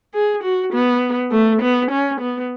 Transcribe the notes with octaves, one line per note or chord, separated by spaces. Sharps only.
G#4
F#4
B3
A3
B3
C#4
B3